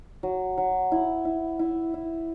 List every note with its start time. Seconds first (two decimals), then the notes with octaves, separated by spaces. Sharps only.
0.23 F#3
0.58 F#3
0.92 E4
1.25 E4
1.59 E4
1.94 E4